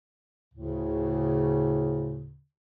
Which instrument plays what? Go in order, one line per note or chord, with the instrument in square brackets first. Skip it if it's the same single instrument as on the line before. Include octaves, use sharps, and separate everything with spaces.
[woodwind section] D2 A2 C#3